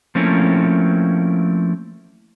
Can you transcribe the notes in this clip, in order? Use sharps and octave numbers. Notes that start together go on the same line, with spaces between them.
F3 A3 A#3 C4 C#4 E4